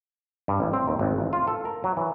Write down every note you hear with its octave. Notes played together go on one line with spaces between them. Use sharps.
G2
A1
C4
D#2
G#1
A1
F4
A4
A#4
F#3
E3